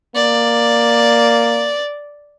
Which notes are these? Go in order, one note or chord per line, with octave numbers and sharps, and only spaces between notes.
A#3 D5